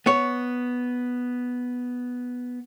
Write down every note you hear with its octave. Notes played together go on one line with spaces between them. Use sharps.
B3 C#5